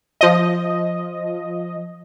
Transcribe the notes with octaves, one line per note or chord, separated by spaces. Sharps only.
F3 D#5